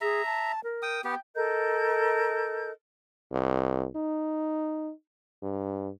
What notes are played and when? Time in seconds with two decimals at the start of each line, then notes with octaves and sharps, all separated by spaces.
0.01 G#4 E5 A#5
0.26 A5
0.64 A#4
0.82 G5 D#6
1.04 B3 G4 G5
1.35 A4 A#4 D#5 G6
3.31 C2
3.96 D#4
5.42 G2